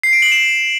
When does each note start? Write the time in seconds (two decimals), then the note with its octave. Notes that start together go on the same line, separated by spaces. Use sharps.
0.03 C7
0.13 D7
0.22 F#7
0.32 E7